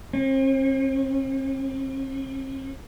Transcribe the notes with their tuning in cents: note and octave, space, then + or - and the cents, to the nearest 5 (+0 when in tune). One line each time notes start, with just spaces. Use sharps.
C4 +45